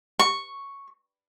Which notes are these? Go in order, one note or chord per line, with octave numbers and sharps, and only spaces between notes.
C#6